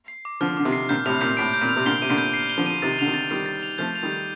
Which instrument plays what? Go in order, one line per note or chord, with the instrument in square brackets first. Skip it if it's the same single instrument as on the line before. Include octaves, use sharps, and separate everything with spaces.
[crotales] C7
D6
[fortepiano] D3 F3 [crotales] F6
[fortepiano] D3 [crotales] D6
[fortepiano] C3 D#3
[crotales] C7
[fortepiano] A#2 D3 [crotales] G6
[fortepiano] A2 C3 [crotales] F7
[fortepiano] A#2 [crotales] G6
[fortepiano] A2 [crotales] D7
[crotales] G6
[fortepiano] A#2
[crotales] F7
[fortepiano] C3
[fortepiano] A#2 D3 [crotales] G7
[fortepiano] C3 [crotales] D#7
[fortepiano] A#2 D3
[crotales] G6
C7
G7
[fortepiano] D3 F3
[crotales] D#7
[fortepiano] C3 D#3 [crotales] A6
[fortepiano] D3 [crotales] F7
[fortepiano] C3 D#3
[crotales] A6
[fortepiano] D#3 G3 [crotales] C7
[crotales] A6
F7
[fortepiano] F3 A3 [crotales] G6
[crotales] F7
[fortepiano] D#3 G3
[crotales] G6